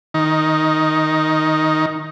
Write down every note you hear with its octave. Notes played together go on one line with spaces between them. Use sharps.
D#3 D#4